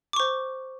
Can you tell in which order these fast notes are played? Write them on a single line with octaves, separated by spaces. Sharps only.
D6 C#6 C5